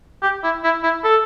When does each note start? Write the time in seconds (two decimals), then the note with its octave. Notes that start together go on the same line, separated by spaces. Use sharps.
0.22 G4
0.44 E4
0.64 E4
0.83 E4
1.04 A4